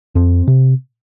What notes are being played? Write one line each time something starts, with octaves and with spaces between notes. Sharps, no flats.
F2 C4
C3